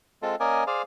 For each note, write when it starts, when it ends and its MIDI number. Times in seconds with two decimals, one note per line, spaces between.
0.22 0.35 56
0.22 0.35 60
0.22 0.35 65
0.22 0.35 69
0.40 0.64 58
0.40 0.64 61
0.40 0.64 70
0.40 0.64 74
0.40 0.64 75
0.40 0.64 80
0.67 0.82 68
0.67 0.82 72
0.67 0.82 74
0.67 0.82 77